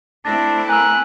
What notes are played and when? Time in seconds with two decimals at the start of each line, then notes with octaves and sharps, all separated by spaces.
0.25 A3 C4 D4 E4 A6 A#6
0.69 A#4 G#5 E6 F#6